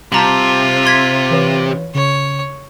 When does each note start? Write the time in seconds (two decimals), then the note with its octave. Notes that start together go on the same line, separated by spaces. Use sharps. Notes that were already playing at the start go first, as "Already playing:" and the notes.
0.12 C3 G3 F4 A5 A#5 F#7
0.85 C6 G#6 B6
1.31 E3 B4 C#5
1.95 C#3 C#5